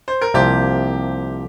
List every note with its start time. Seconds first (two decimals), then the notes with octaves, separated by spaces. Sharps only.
0.08 C5
0.21 A#4
0.34 C2 C3 F3 A#3 G4